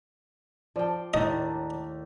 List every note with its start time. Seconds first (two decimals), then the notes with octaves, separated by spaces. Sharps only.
0.76 F3 D5 G5 A5
1.14 D#2 A2 D#3 D4 D#5